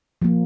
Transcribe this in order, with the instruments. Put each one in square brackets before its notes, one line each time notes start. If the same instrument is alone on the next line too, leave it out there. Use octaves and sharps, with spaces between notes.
[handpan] F3 A#3